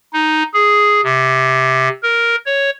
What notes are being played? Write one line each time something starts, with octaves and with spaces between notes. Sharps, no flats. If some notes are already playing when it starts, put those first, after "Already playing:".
D#4
G#4
C3
A#4
C#5